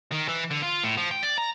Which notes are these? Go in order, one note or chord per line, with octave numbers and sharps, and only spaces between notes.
D#3
E3
D3
F4
A2
F3
G5
D5
A#5